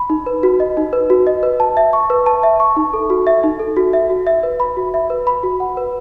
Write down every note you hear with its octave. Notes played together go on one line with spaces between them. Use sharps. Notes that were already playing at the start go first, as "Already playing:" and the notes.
Already playing: B5
D#4
B4
F#4
D#5
D#4
B4
F#4
D#5
B4
A5
E5
C#6
B4
A5
E5
C#6
D#4
A4
F#4
E5
D#4
A4
F#4
E5
F#4
E5
B4
B5
F#4
E5
B4
B5
F#4
F#5
B4